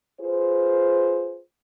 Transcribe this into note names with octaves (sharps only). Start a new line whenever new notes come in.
F4 G#4 B4 C5